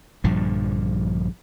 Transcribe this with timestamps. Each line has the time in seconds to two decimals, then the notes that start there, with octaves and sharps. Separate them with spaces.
0.24 A#1 G2 D3 F3